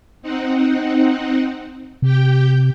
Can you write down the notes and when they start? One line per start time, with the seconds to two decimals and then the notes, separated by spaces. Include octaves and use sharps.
0.22 C4 D#4 F#5
2.02 C3 G4 G5